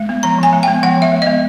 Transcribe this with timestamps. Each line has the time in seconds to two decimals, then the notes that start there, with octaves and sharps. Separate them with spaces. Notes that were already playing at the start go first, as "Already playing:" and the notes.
Already playing: G#3
0.09 B3
0.23 F3 A#5
0.39 F3 G#5
0.53 G#3
0.63 B3 G5
0.83 F3 F#5
0.97 F3
1.02 E5
1.12 G#3
1.22 B3 D#5